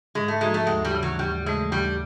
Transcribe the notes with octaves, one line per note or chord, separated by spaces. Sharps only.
G#2 G#3
A3
F3 G#3 A#3 D#4 F#4
A3
D#2 G#3
G3
C#3 E3 A3
F#3
D#2 G3
C#3 E3 G#3 A3
D#2 G3